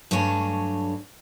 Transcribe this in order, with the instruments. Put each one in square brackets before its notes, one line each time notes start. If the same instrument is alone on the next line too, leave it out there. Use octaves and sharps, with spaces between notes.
[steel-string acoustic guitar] G2 F#3 A3 D4 C#5 G#5